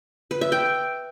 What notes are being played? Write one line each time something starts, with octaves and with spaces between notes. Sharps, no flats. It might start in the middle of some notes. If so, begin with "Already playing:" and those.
B4
E5
G5